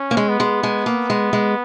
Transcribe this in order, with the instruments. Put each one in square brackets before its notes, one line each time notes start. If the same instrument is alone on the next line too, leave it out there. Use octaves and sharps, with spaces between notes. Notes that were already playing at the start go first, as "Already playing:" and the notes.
Already playing: [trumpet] C#4
[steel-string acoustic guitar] A#3
G#3
[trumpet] B3
[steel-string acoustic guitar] G#3
G#3
A#3
G#3
G#3